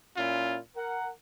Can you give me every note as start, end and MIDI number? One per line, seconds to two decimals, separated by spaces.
0.17 0.58 46
0.17 0.58 61
0.17 0.58 64
0.17 0.58 65
0.76 1.09 70
0.76 1.09 78